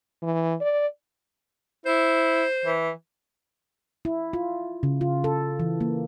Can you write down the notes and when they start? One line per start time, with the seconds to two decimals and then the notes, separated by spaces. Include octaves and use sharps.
0.22 E3
0.61 D5
1.86 E4 C5
2.65 E3
4.05 E4
4.33 F4
4.83 C#3
5.01 F4
5.24 A4
5.60 E3
5.81 A#3